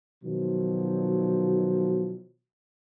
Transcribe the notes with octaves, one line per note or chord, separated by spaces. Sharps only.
B2 D#3 F3 F#3